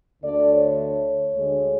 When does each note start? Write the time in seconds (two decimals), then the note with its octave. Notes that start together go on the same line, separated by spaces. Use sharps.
0.23 D2 D3 A3 D5
0.50 C#5
0.79 C#5
1.35 D2 D3 G#3